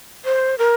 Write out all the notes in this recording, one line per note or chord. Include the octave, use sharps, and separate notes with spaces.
C5
A#4